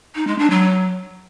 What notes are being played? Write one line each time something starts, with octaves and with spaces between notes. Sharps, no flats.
D#4
G#3
D4
F#3